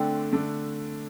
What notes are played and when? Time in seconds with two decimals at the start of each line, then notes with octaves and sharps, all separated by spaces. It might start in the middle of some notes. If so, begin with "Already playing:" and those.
Already playing: D3 A3 C4 D4
0.33 D3 A3 D4